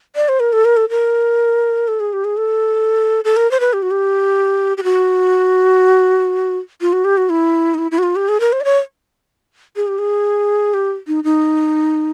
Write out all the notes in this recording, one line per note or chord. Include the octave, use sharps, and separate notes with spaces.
D5
C5
A#4
A4
A#4
A4
A#4
A4
G#4
G4
G#4
A4
A4
A#4
C5
B4
G4
F#4
G4
G4
F#4
F4
F#4
G4
F#4
E4
D#4
E4
E4
F#4
F4
G4
G#4
A#4
C5
D5
C#5
G#4
G4
G#4
G4
D#4
D#4